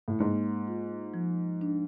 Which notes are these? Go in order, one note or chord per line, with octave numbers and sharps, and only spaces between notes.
A2
G#2 A#3
F4
F3
D4